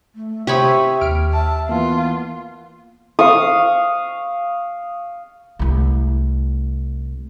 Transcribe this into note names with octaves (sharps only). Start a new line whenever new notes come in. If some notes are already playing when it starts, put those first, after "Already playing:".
A3
C3 G4 C5 C#5 E5 B5 D#6
D#2 F6 D7
E5 A5
E3 A#3 B3 F4
F5 C#6 D#6
C2 A3